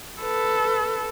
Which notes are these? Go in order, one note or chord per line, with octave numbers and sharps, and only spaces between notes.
A4 B4